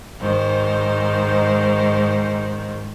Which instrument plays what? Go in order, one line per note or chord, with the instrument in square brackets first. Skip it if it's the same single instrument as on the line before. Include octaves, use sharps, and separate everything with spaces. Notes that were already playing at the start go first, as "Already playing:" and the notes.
[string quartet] G#2 D#3 C5